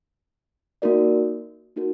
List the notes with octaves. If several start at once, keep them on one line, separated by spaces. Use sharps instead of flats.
A#3 D#4 F#4 A#4 D5
A#3 D#4 F#4 A#4